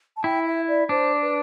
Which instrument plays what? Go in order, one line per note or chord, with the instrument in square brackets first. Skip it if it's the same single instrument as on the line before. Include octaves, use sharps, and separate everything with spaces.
[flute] A5
[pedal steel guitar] E4 [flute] G5
[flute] E5
D5
[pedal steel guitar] D4 [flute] C5
[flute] B4